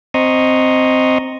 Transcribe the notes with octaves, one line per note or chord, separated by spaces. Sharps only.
C4 D#5 A#5 C6 C#6 D#6